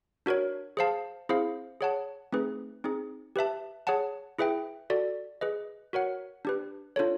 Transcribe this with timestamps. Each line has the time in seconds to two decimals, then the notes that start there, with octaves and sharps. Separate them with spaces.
0.26 D4 F#4 A#4 C#5
0.77 G#4 C5 F5 A5
1.29 C4 E4 G#4 C5 F5
1.81 G#4 C#5 F#5 A5
2.32 A3 C4 D#4 G#4 B4
2.84 C4 D#4 G#4
3.36 G4 B4 E5 A5
3.87 G#4 C#5 F#5 A5
4.39 E4 G#4 B4 E5 G5
4.90 F#4 A4 D5
5.41 G#4 B4 D#5
5.93 F#4 A#4 C#5 F#5
6.45 D4 G4 B4
6.96 D4 F4 A4 C#5